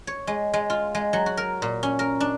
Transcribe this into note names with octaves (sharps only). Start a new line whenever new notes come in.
C#5
G#3
G#3
F4
G#3
F#3
F#4
A#4
A#2
C#4
A#4
D4